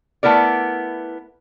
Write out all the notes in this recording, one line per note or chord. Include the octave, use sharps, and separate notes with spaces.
A3 B3 E4 A#4 D5